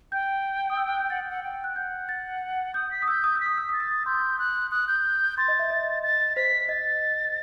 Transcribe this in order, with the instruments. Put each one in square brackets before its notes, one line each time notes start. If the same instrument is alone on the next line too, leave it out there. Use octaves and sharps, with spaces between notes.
[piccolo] G5 [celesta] G6
[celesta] D#6
E6
F#6
G6
[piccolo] F#5 [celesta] A6
[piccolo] F#5
G5
[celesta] F#6
[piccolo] F#5 [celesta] G6
[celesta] A6
[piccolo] D#6 [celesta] G6
[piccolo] B6
[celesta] D#6
[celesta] E6 [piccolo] G6
[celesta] D#6
E6
[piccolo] B6
[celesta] D#6
E6
[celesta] D#6 [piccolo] A6
[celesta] E6
D#6
[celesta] C6 [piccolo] G6
[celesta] D#6
C6
[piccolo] F#6
[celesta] D#6 [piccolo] F#6
[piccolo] G6
[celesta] C6 [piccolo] A6
[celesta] D#5
E5
D#5
[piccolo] A6
[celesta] C5 [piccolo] B6
[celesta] D#5 [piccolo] A6